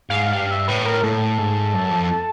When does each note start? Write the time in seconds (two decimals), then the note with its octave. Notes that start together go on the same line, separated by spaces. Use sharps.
0.10 G#2 F5
0.33 G2 F5
0.51 E5
0.68 A2 B4
0.85 A#4
1.03 A2 A4
1.38 G#2
1.74 F#2
1.91 F2